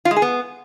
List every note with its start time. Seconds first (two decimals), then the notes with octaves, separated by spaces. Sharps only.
0.05 F4
0.11 G#3
0.16 G#4
0.22 B3